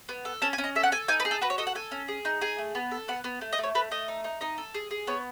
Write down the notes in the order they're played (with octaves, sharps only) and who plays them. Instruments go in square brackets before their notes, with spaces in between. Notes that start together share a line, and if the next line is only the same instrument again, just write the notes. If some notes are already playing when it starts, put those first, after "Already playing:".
[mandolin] B3
A4
C#4 A5
G#5
C#4
D#5
A4 E5
F#5
A4 G#5
D#4 G#5
B4
G#4
A4
F#4 B4
C#5
A4 D#5
F#5
A4 G#5
C#4
G#4
D#4
G#4 G#5
A3
B3
A4
B3 F#5
B3
A3
D#5
A3
C#5
A3 B4
A3 D#5
D#4
D#4
D#4 D#5
A4
G#4
G#4
B3 C#5